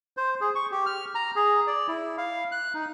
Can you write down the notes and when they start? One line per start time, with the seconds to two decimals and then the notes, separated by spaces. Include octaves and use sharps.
0.17 C5
0.41 G#4
0.55 C#6
0.71 G4
0.86 F6
1.15 A#5
1.36 G#4
1.67 D5
1.88 E4
2.18 F5
2.52 F#6
2.74 D#4